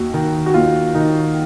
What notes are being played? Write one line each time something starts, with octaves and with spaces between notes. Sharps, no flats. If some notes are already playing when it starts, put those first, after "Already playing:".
Already playing: D#2 F#4
D#3
F#4
D#2 F4
D#3 D#4